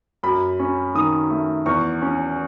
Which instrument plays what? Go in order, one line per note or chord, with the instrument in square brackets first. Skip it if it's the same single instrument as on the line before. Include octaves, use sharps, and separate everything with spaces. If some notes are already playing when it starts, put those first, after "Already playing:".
[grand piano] F#2 B5
C#4
D#3 D#6
A3
E2 C#6
C#4